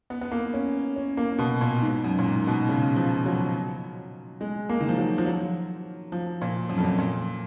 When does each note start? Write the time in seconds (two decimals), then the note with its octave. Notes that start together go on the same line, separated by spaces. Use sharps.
0.10 B3
0.21 B3
0.31 A#3
0.54 C#4
0.96 C#4
1.17 A#3
1.38 B2
1.61 A#2
1.82 G#2
2.04 F#2
2.19 A#2
2.25 G#2
2.47 B2
2.69 C#3
2.96 F3
3.26 F#3
4.41 G#3
4.69 A#3
4.80 D#3
4.89 F3
4.98 F#3
5.18 F3
5.26 F#3
6.12 F3
6.41 A#2
6.69 F#2
6.78 F2
6.84 F#2
6.98 A#2